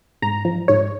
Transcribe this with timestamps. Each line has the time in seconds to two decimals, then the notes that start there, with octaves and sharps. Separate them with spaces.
0.22 G#2 A#5
0.45 F3
0.68 G#2 C#5